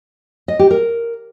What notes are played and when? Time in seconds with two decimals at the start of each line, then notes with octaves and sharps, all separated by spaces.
0.48 D#5
0.59 G4
0.71 A#4